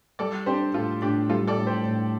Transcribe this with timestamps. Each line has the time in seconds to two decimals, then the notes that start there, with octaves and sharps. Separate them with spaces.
0.19 G3 A4 D5
0.46 D4 G4 C5
0.74 A2 F4 A4
1.02 A2 D4 G4
1.29 G3 F4 A4
1.47 A4 D5
1.57 A2
1.67 G4 C5
1.84 A2